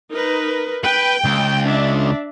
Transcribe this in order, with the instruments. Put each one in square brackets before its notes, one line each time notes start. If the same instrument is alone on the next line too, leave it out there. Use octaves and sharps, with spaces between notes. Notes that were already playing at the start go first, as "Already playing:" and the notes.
[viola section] D#4 A#4 B4
[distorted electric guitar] B4 [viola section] G5
[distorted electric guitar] C#2
[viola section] D4 E5